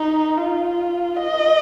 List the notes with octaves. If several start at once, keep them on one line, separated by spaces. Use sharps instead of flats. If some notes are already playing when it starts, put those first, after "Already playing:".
Already playing: D#4
F4
D#5